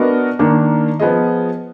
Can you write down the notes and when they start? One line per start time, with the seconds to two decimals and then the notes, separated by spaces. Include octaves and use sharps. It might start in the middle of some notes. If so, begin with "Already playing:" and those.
Already playing: B3 D4 F#4 A#4 D#5
0.39 D#3 A#3 D4
0.99 F3 B3 F4 G#4 D#5